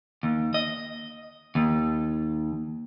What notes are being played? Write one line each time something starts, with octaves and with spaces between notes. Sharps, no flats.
D#2
D#5
D#2